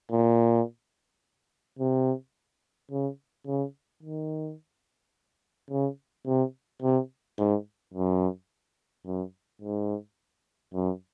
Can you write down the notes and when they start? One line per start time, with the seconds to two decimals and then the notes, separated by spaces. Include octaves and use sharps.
0.11 A#2
1.79 C3
2.91 C#3
3.47 C#3
4.03 D#3
5.70 C#3
6.26 C3
6.82 C3
7.38 G#2
7.94 F#2
9.06 F#2
9.62 G#2
10.74 F#2